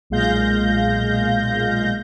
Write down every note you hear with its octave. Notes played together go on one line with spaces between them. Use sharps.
B1 A#2 G#3 F5 G6 A#6